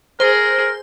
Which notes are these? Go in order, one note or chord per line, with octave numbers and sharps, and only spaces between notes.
G#4 A#4 C5